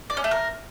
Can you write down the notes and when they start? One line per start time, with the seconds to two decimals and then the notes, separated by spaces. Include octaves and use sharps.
0.10 D5
0.17 C#4
0.24 A3
0.31 A#4